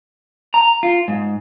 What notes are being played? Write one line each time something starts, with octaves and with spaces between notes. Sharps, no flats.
A#5
F4
G#2